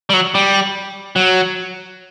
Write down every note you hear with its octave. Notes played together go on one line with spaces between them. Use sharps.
G3
F#3
G3
F#3